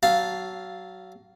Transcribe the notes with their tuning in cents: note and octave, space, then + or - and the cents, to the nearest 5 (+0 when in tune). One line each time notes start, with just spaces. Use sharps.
F#3 +20 F5 -10 A5 +0